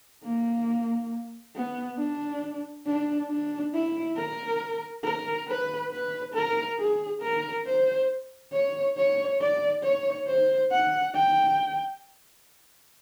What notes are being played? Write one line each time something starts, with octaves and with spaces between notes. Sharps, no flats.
A#3
B3
D4
D4
D4
E4
A#4
A#4
B4
B4
A#4
G#4
A#4
C5
C#5
C#5
D5
C#5
C5
F#5
G5